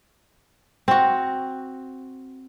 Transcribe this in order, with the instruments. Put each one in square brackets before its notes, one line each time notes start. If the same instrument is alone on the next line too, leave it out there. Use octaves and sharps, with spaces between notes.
[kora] C4 F#4